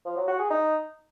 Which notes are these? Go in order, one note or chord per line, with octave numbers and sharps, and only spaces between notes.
F3
F#3
F#4
G#4
D#4